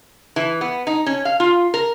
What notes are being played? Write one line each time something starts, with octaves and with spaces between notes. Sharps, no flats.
E3
B3
D#4
C#4
F5
F4
A#4